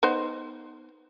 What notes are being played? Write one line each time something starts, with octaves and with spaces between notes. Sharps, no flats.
B3 D#4 C5